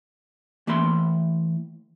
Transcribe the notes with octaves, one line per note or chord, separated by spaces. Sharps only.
E3 A3 A#3 G5 B5 C6